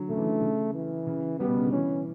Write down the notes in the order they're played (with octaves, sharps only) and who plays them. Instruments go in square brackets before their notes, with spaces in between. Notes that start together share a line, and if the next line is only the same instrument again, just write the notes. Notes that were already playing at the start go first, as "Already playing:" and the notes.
Already playing: [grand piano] D3 F#3
[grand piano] C#3 [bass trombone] A3
[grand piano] E3
D3
C#3
[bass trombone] E3
[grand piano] C#3
[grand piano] G3 [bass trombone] B3
[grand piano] B2
C#3
D3
[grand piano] E3 [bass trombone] C#4